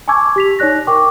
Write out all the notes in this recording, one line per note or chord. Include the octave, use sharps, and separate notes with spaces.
G#5 A5 C#6 D6 E6 G#6
G4 B6 F7
D#4 C#5 D5 F#6 A#6
A#4 G5 C#6 D6